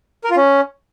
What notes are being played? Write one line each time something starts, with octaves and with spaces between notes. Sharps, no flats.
A#4
F4
C#4